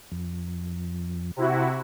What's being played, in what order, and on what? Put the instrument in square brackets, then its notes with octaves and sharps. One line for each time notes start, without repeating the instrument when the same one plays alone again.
[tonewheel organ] F2
[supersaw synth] C3 E4 F#4